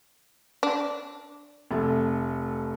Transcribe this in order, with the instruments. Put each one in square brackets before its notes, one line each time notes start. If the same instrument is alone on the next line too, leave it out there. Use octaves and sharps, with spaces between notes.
[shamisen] D4
[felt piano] F1 A3